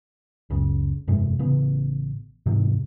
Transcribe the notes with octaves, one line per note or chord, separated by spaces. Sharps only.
F#1 C#2 C#3
F1 G2 C3 G#3
A1 C#3 B3
G#1 E2 G#2 C3